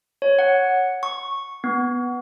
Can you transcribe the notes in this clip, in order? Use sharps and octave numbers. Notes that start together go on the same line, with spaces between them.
C#5
F#5
C#6
B3